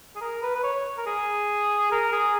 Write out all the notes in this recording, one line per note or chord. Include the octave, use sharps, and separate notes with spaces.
G#4
A#4
B4
B4
C#5
A#4
G#4
A#4
G#4